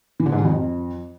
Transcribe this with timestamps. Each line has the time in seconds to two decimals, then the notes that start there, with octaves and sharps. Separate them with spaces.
0.20 E3
0.26 D3
0.32 G#2
0.39 D#3
0.45 F2